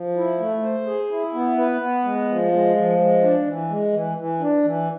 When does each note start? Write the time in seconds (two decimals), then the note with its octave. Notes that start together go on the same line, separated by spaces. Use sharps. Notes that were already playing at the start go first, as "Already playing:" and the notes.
Already playing: F3
0.16 E4
0.40 A3
0.63 C5
0.87 G#4
1.11 E4
1.34 B3
1.58 B4
1.81 B3
2.04 G#3
2.29 F3
2.52 G#3
2.76 F3
2.99 G#3
3.23 D4
3.47 E3
3.69 G#3
3.93 E3
4.17 E3
4.41 D4
4.64 E3